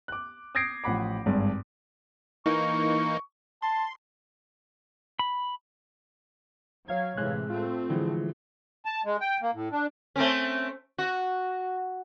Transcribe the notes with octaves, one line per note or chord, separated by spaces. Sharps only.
D6 F#6
D#6 G6 G#6 A#6 C7 D7
A1 F3 F#5 B5 D6
G#1 G2
E3 A#3 D#4 C#6
A5 C6
B5
F#3 C#5 F5 G#6
A2 C3 E3 G#3 G#4 F#6
A3 C4 F4
D3 E3 F3 G#3
A5
G#3
G5
A#3
A2
D4
A3 C4 C#4
F#4